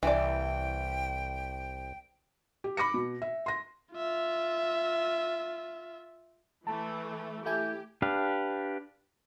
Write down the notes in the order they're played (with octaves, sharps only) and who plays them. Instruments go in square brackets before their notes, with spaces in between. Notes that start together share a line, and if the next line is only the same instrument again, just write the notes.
[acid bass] C2 [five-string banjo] E3 D5 [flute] G5
[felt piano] G4
B5 D6 A#6 C#7
B2
E5
C6 A#6
[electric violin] F4 E5
[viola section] E3 A3 [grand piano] A5
[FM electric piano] A3 E4 G#5 [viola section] G4 [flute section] G6
[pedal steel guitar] D4 G4 B4 F5